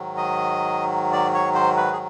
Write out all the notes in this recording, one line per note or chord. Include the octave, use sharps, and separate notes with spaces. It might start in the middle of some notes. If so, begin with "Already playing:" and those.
Already playing: G#2 D#3 F#3
D#5
D5
C#5
C5
B4
G#4